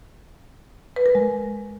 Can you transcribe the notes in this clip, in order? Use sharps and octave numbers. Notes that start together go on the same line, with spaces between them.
B4
A#4
G#3